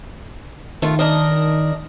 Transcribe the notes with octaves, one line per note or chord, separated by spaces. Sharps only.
D#3 A3 F4
D4 A#4 D#5